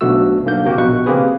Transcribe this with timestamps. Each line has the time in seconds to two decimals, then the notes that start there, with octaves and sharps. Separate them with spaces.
0.01 B1 B2 D3 A3 F#4 E6
0.45 B1 D3 A#3 G6
0.65 C3 A#3 F#4 G4
0.78 A#1 B2 C#6 F#6
1.06 C#3 A#3 C4 G4 G#4 B4